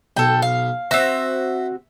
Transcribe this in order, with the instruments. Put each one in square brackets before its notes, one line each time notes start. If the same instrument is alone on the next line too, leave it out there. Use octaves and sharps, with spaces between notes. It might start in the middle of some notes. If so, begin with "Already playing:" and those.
[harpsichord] B1 [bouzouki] A4 G5
[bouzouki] F5
[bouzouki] C4 F#4 [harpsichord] C5 E5